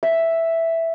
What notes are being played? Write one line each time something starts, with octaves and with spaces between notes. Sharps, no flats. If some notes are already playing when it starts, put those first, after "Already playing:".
E5